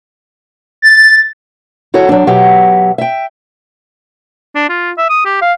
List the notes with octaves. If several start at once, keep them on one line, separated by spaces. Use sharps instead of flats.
A6
E4 F#4 A4 C#5
F#3 D4
B2 F#3 G4 E5
E5 G5
D4
F4
E5
D#6
G4
F5